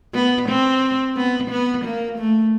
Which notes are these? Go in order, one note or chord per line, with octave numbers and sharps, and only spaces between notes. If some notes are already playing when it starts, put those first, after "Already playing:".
B3
C4
B3
B3
A#3
A3